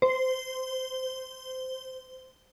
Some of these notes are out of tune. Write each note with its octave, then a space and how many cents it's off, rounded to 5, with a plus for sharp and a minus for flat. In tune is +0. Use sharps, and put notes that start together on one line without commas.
C5 -15